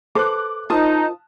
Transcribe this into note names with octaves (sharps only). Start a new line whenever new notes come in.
A4 B4 C5 D6 F#6
D#4 F4 A#4 C5 A5 D#6